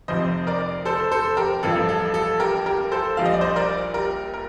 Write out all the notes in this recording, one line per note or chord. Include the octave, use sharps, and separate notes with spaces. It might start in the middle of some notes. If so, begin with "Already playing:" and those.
F1 F2 C3 C5 D#5
A#4 D5
A4 C5
A4 C5
G4 A#4
A1 G2 F3 A4
A4
A4
G4 A#4
G4 A#4
A4 C5
A#1 A#2 G3 F5
D#5
D5
C5 D#5
A#4 D5
G4 A#4
A#4